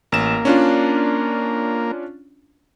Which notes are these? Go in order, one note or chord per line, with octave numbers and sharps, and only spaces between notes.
A1 A#3 E7
C#4 D4 F4